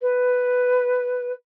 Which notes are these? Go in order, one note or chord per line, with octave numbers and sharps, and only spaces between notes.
B4